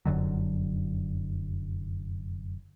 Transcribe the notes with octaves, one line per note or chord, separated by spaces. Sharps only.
F1 F#2 D3 F#3